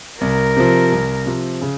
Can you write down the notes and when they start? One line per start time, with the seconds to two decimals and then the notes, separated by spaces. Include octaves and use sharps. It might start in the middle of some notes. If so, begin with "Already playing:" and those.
0.21 C2 A#4
0.57 C3 F3
0.92 C2
1.26 C3 F3
1.61 C#3